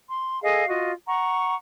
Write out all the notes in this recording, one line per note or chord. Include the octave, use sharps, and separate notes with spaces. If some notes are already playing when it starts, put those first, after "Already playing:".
C6
G#4 A4 D#5 F5
F4 F#4 D#5
F#5 A#5 C#6